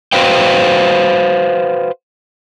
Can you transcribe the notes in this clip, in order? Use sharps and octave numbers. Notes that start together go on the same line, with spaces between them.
F#4 B4 C5 F5 G5